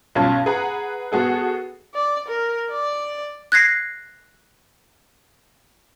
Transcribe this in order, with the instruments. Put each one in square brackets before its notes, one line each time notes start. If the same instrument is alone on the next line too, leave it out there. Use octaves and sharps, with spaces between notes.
[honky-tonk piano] B1 G2 C#4 F4 A5 G#6
G#4 B4 F#5 A#5 F#6
B3 F#4 G#4 A4
[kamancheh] D5
A#4
D5
[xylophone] F#6 G#6 A#6 C7